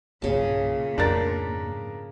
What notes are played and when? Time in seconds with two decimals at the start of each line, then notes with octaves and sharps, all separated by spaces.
0.22 B1 G2 A#2 C#3 A5
0.98 F2 G#2 D4 A#4 A6